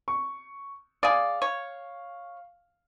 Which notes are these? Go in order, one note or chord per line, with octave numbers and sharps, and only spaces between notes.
C#6
G#4 D5 F5
C#5